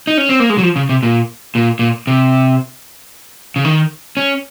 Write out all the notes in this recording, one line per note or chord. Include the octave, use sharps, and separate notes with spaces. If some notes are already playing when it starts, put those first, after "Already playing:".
D#4
C#4
C4
A#3
G#3
F#3
F3
C#3
C3
A#2
A#2
A#2
C3
C#3
D#3
C#4